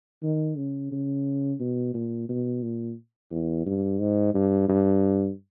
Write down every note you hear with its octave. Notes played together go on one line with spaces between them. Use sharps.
D#3
C#3
C#3
B2
A#2
B2
A#2
E2
G2
G#2
G2
G2